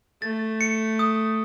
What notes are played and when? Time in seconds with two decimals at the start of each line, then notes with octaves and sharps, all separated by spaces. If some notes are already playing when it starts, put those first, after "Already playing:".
0.22 A3 A6
0.61 C#7
0.99 D#6